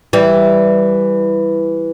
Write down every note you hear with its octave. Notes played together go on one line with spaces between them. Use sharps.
E3 G3